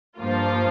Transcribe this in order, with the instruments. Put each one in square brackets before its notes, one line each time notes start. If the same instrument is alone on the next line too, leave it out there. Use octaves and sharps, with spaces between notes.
[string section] G2 F3 A#3 F4